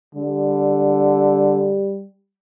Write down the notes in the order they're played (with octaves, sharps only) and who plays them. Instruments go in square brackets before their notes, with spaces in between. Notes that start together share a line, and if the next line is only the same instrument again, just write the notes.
[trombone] D3 [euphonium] G3